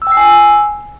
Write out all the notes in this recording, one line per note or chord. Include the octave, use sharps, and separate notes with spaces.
E6
G5
C7
G#5
E6